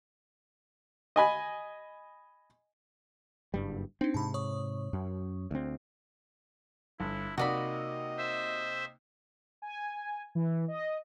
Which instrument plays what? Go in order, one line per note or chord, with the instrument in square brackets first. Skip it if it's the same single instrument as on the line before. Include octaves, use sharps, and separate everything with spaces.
[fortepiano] D#5 G#5 B5
[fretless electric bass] F#1 G2 G3
[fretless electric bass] C4 [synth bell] D4 D#4
[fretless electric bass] G#2 C3 [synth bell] A5 B5
[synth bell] C#5 C#6 D#6
[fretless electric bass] F#2
D2 C4
[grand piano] G1 [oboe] E4
[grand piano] C3 A#3 D#4 [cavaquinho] F#4 D5 B5 [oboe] D#5
[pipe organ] C5 E5
[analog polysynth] G#5
E3
D#5